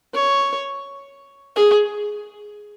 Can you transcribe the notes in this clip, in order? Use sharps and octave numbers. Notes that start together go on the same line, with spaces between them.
C#5
G#4